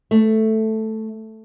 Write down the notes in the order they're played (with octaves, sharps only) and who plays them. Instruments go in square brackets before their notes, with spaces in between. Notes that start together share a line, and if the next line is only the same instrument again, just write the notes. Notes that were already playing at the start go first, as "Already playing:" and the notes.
[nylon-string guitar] A3